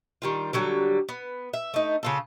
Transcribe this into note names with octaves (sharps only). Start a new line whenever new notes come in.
D#3 G3 F4
D3 F#3 G3 G4
B3
E5
A3 D#4
C#3 F4 A4